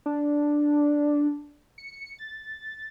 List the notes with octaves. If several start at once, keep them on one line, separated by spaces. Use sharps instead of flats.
D4
C#7
A6